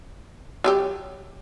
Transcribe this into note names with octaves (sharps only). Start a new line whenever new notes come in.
F#3 F4 G4